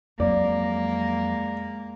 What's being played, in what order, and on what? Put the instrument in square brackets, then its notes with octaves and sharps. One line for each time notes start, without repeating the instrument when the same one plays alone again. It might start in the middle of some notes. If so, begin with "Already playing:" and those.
[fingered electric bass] F2 F#3 [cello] G#3 A#3 [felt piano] D5